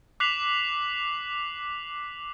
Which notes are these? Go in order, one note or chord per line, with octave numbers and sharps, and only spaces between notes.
D6 F#6 B6 C7 F7 F#7